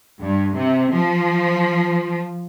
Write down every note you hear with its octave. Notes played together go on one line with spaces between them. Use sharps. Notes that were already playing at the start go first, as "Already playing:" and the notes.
G2
C3
F3